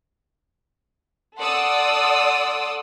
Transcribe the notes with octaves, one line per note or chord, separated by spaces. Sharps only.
A4 D5 F#5 C6 D#6 E6